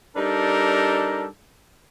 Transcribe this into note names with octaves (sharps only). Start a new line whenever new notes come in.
G3 D4 D#4 A4 A#4